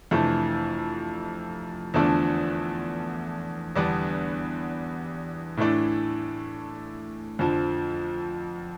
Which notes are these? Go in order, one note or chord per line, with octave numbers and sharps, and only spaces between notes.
F2 C3 E3 A3 D4
E2 D3 F3 A3 D4
E2 D3 G3 B3 D4
A2 E3 A3 D4
F2 D3 F3